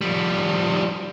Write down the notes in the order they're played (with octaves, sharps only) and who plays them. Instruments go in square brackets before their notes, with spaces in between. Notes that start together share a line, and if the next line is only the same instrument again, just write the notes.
[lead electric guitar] F3 G3